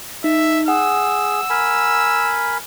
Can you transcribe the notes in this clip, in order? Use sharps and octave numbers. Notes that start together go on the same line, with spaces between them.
D#4 E5
G#4 F#5 E6
A#4 G#5 B5